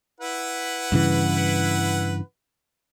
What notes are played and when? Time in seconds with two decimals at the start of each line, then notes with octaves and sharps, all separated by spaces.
0.21 E4 B4 F#5
0.92 G2 C#3 E3